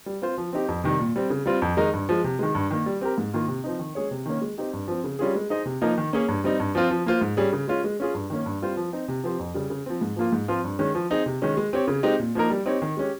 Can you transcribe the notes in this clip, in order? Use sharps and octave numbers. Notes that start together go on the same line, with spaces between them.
G3
C4 F4 C5
F3
C4 D#4 G4
F2
C3 D#3 G3
A#2
G3 C4
C#3
G3 C4 F4
F2
D#3 G#3 D#4 A#4
G2
F3 G#3
C3
D#3 G#3
G2
D#3 A#3
G3
C4 G4 A#4
G#2
D#3 A#3 F4
C3
F3 C4 D#4
D#3
G#3 C#4 G#4 C#5
C3
D#3 A#3 C#4
G#3
C4 D#4 G4
G2
F3 C4
C#3
G3 C#4 F4 G#4
G#3
D#4 G#4 C5 D#5
C3
F3 A#3 D#4 A#4
D#3
A#3 C#4 G#4 C#5
G2
G3 C4 D#4
G2
F3 C4 F4
F3
A#3 F4 C5
G#2
G3 C#4 G#4
C#3
G#3 C#4 F4
G#3
C#4 F4 G#4
G2
D#3 A#3 C#4
G2
G3 C4 F4 C5
F3
C4 D#4
C3
F3 C4 G4 C5
F2
C#3 G3
C#3
F3 C4
G#2
F3 A#3 F4
G#2
F3 C4 F4 C5
G2
D#3 G#3 C#4
F3
C4 D#4 G#4
C3
D#3 G#3 C#4
G#3
C4 G4 C#5
C#3
G#3 C4 D#4 G4
A#2
F3 A#3 D#4 A#4
G3
C4 D#4 G4 C#5
D#3
G#3 C#4 G4